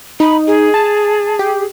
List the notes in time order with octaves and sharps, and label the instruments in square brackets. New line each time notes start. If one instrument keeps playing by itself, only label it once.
[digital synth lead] D#4 [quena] B5
[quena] G#4
[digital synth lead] A5
G4